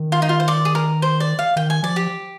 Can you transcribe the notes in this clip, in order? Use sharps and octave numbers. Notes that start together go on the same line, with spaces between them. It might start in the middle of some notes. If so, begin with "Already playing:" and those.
Already playing: D#3
F4
D#4
F4
C5
D5
G#4
A#4
C5
D5
F5
D#3 G5
G#5
F3 D5
G4